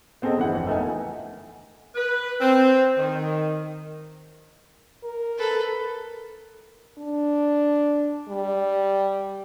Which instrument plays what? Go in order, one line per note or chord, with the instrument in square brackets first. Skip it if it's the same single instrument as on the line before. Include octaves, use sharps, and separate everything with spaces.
[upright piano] B3 C4 G#4 A4 D#5
G1 E3 F#5
F2
A3 B3 D#4 A#4 F#5 G#5
[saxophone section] B4
C4
D#3
[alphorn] A#4
[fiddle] A4 B4
[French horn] D4
G3